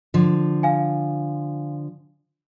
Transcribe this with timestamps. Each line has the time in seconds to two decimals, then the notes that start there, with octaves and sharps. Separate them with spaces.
0.14 D3 F3
0.63 F5 G#5